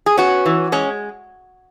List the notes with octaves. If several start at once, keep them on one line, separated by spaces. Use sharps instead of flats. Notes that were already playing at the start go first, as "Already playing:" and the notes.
G#4
B3 C#4 F#4
E3
G#3 C#4